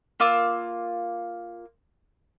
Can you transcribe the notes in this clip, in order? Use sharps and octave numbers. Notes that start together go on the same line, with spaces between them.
A#3 F4 D6 E6